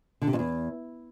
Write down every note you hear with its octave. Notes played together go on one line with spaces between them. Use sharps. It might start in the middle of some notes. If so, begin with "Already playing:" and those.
D3
C3
F2
E2